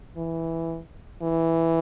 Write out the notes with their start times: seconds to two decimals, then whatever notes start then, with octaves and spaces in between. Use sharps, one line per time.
0.17 E3
1.22 E3